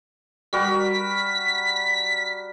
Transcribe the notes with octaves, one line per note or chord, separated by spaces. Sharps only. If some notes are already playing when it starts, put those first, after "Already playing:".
G3 F#4 A#4 B6